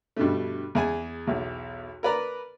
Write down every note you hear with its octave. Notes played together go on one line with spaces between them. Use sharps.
G2 B2 D3 A3
E2 G#4 G#5
B1 E2
A#4 B4 D5 A#5